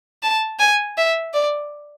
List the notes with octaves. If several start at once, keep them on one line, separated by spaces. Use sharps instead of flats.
A5
G#5
E5
D5